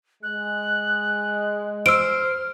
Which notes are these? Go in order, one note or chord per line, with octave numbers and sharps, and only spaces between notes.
G#3 F#6
C5 E6 F6 D7